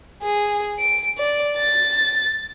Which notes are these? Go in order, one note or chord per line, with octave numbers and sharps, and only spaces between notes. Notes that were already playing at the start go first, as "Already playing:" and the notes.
G#4
D7
D5
A6